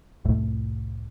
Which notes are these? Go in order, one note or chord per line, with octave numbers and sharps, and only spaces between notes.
C2 F2 A2 A3